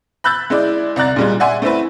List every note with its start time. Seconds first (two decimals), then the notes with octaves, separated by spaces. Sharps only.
0.24 B5 E6 F#6 G6 A6
0.50 G#3 E4 D5
0.96 C2 D5 A#5 F#6 A6
1.16 A#2 G3 G#3
1.40 D5 E5 F#5 G#5 C6
1.62 A3 C4 E4 B4